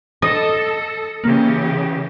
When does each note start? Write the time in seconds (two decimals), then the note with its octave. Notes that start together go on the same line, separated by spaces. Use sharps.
0.22 A4 D#5
1.24 C#3 E3 A#3 G4